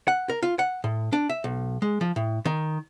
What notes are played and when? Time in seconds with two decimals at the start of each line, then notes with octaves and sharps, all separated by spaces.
0.08 F#5
0.30 A#4
0.43 F4
0.59 F#5
0.84 A2
1.13 D4
1.29 E5
1.44 B1
1.82 G#3
2.01 F3
2.16 A2
2.45 D#3